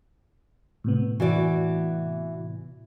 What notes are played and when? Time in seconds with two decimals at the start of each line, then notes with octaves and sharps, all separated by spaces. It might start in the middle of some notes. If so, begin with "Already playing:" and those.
0.84 A2 C3 B3
1.20 E3 F#4 D5